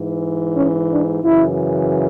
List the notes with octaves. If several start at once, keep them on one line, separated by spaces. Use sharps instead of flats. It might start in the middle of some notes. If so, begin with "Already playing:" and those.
Already playing: G#2 E3
C#4
D4
F#2 C#3 E3 E4